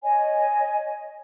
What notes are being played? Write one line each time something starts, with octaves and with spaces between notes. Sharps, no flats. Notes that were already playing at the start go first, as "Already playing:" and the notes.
C#5 D#5 G#5